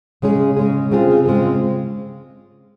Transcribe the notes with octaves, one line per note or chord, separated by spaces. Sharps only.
C#3 G#3 C#4 G#4
C#3 G#3 C#4 G#4
C#3 G#3 C4 F4 G#4
C#3 G#3 C4 F4 G#4